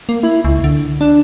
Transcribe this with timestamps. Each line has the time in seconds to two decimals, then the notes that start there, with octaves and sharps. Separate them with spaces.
0.09 A#3
0.23 E4
0.45 C#2
0.64 D3
1.01 D4